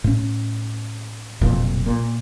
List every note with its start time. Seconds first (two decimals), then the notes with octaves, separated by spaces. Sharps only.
0.04 A2 C#4
1.41 F1 B1 F2 A#2
1.86 A#2